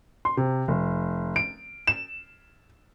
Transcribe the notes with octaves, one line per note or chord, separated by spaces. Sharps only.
C6
C3
F1
D7
E7